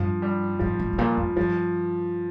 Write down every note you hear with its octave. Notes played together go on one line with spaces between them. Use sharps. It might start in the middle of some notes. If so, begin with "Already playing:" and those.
Already playing: G2 F3
G3
G#2 F3
G#2
G#2
A#2 F3
F2
G2 F3